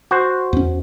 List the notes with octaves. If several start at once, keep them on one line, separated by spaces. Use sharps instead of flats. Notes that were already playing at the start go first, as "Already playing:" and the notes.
F#4 C5
E2 C#4